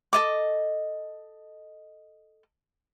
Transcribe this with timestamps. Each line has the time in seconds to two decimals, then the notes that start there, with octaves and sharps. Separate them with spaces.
0.13 A4 D#5 D6